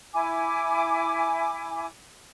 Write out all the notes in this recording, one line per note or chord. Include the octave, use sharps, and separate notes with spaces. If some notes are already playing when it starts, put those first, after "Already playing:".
E4 G#5 D6